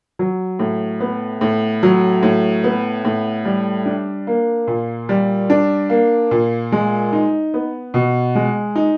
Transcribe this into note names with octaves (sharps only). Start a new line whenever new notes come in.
F#3
A2
B3
A2
F#3
A2
B3
A2
G3
D4
A#3
A#2
G3
D4
A#3
A#2
G#3
D#4
B3
B2
G#3
D#4